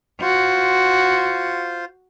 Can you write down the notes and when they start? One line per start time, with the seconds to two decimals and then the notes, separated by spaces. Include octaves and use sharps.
0.21 F4 F#4 C5